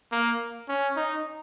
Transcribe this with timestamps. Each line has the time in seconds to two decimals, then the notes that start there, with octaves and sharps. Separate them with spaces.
0.12 A#3
0.68 C#4
0.96 D#4